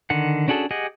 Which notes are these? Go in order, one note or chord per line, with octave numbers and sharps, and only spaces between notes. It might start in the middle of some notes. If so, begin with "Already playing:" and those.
D3 D#3 F#5
C#4 D4 F#4 G#4 A4
G4 G#4 D#5 F#5